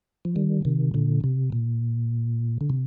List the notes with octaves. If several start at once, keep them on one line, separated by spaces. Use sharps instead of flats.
F3
D#3 G3
C3 D#3
A#2 D3
C3
A#2
D3
C3